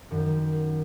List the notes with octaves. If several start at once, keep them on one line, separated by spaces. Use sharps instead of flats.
F#2 D#3 F#3